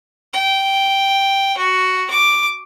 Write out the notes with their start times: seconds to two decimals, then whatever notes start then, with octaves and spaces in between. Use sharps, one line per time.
0.33 G5
1.57 F#4
2.10 D6